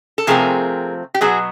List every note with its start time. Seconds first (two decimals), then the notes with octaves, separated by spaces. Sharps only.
0.18 A4
0.27 C3 F3 A3 C4 G#4 A#4
1.14 G4
1.21 B2 F#3 B3 F#4 G#4